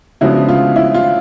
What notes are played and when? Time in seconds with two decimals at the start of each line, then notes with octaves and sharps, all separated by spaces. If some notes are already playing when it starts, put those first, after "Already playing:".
0.21 C#3 F3 G#3 B3 D4 E4 F#4
0.49 F4
0.76 E4
0.94 F4